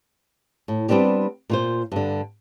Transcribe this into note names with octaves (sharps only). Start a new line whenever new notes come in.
A2
G3 B3 C4 D4 G4
A#2 F4 C5
G2 D3